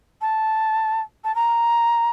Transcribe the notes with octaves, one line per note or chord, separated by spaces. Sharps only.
A5
A5
A#5